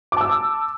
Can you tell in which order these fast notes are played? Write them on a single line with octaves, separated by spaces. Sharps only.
D6 A5 E6